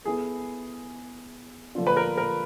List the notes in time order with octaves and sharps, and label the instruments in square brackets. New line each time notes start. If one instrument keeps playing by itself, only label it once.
[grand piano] B3 E4 A4 [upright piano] G#4
[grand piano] D3 F3 A#3 D4 F4
[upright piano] B4
A#4
A#4